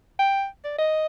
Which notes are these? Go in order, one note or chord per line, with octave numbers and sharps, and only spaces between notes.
G5
D5
D#5